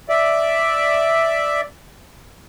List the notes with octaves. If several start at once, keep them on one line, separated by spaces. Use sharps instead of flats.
D5 E5